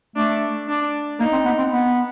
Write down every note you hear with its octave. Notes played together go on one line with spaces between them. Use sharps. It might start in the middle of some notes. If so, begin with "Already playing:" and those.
A3 D4
D4
A#3 D#4
C4
B3
C4
B3